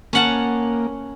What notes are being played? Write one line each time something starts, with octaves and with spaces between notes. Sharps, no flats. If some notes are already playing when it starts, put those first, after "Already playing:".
A#3 C#4 F#5 A5